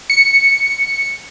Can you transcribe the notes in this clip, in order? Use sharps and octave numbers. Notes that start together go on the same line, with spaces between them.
C#7